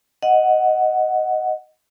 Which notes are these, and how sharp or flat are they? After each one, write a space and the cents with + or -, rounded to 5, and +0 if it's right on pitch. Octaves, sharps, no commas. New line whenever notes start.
D#5 +5 F#5 +0